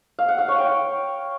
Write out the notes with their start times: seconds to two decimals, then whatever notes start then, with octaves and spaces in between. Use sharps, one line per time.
0.19 F5
0.28 F#5
0.38 F5
0.48 C#5
0.58 G5